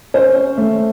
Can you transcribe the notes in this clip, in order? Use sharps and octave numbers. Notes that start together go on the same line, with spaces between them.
C#4 C5
C#4
A3